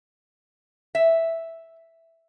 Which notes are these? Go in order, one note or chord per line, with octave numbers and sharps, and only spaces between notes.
E5